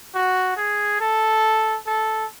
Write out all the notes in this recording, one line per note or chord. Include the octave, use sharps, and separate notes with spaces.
F#4
G#4
A4
A4